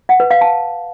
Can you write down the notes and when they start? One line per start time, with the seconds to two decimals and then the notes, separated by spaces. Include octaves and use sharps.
0.09 F#5
0.20 B4
0.31 F5
0.41 A5